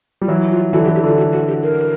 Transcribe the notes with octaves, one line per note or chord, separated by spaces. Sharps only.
G3 F4
E3 F#3 E4
F4
D3 E3 F#4
G4
D3 E3
G4
D3 F4
F#4
F#4
G4
A#4